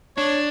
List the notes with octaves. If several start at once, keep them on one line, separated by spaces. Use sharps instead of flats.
D4 C#5